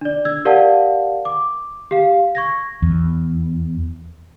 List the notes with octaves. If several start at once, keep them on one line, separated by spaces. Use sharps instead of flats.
D4 D5
E6 G#6
G4 A#4 D5 F5 F#5 A5
D6
G4 F5
C#6 G#6 A#6
E2